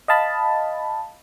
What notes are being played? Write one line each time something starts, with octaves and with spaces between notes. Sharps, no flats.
D#5 F5 A5 B5